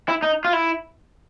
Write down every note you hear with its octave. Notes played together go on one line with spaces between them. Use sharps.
E4
D#4
F4
E4